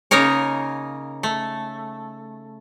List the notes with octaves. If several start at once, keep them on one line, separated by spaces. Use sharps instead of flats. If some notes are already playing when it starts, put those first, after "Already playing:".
C#3 A#3 D#4 A#4 C#5
A3